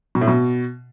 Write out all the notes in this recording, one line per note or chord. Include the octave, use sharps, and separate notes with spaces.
B2
A2
B2